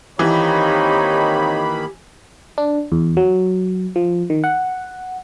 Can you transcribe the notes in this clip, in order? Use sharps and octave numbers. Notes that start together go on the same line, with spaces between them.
D#3 E3 A#3 C4 D#4 G4 C#5 B5
D4
E2
F#3
F3
D#3
F#5